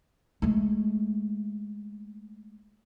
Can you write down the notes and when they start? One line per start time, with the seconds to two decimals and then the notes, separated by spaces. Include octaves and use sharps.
0.42 G#3 A3